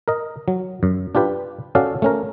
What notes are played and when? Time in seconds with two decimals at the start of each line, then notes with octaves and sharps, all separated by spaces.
0.08 A#4 D#5
0.48 F#3
0.83 F#2
1.15 D4 F4 G4 B4
1.75 C#4 F#4 A4 D5 F5
2.02 A3 C#4 A#4